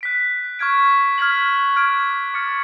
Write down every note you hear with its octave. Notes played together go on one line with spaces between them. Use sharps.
F#6 B6 D7
C#6 F6 G#6 D7
F6 G#6 B6 F#7
D6 F6 G#6 D7
D6 F6 A6 C#7